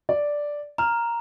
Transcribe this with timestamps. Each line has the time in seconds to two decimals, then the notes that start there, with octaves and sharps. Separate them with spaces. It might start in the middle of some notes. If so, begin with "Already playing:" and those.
0.09 D5
0.78 A#5 F6